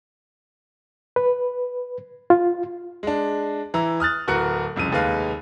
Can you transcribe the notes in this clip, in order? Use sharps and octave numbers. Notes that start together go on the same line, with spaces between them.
B4
F4
G#3 D4
E3 E4 A#5
D#6 F6 F#6 A6
D1 F#4 A#4 B4 F#6 C#7
C2 F2 C#3 D#7
F1 D#2 G#3 B4 F5